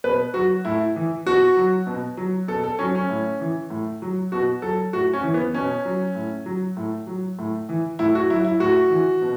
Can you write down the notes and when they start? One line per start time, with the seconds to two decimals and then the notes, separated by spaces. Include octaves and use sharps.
0.04 B2 B4
0.34 F#3 F#4
0.65 A2 E4
0.96 E3
1.26 B2 F#4
1.57 F#3
1.87 B2
2.17 F#3
2.48 B2 A4
2.64 A4
2.79 F#3 C#4
2.95 C#4
3.09 A2
3.40 E3
3.70 A2
4.02 F#3
4.32 B2 F#4
4.62 F#3 A4
4.93 A2 F#4
5.13 C#4
5.23 E3
5.34 B3
5.54 B2 C#4
5.85 F#3
6.15 A2
6.46 F#3
6.77 A2
7.07 F#3
7.39 A2
7.69 E3
7.99 A2 E4
8.15 F#4
8.29 F#3 E4
8.45 E4
8.60 A2 F#4
8.90 E3
9.22 B2